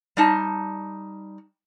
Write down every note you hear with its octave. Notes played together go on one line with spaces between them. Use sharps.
G3 D#4 A5